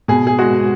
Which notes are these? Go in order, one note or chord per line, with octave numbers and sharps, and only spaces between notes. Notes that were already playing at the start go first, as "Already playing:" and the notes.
B2 G#4
G#4
G#3 F#4